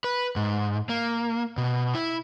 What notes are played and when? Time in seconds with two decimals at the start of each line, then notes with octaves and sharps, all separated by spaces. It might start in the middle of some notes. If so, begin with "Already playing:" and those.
0.04 B4
0.36 G#2
0.89 A#3
1.57 B2
1.95 E4